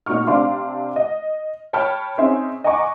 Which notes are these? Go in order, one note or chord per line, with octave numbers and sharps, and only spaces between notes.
A#2 D#4 F#4 C#6 F6
C3 C4 D4 F5 C6 D6
D#5
C#5 G5 A5 B5 F6
C4 C#4 D#4 G#4 E5 C6
D#5 F#5 G#5 A#5 C#6 D6